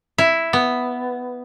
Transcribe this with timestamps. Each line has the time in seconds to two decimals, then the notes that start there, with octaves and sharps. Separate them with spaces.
0.18 E4
0.53 B3